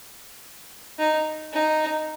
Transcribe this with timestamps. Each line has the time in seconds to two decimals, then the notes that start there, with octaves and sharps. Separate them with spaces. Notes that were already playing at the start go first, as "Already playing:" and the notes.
0.99 D#4
1.53 D#4